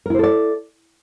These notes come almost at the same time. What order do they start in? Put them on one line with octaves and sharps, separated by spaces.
A#4 E4 C5 A4 D5